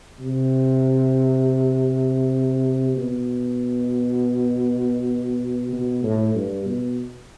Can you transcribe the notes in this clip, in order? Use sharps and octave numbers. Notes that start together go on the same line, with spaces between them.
C3
B2
B2
A2
G2
B2